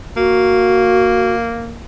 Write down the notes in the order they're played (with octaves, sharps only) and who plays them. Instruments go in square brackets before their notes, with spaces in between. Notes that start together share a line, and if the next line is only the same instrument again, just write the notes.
[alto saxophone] A#3 [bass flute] F#4